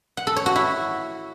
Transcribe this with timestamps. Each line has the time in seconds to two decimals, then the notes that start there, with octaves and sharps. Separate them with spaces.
0.17 F#5
0.27 A4
0.36 C#5
0.46 F#4
0.56 E4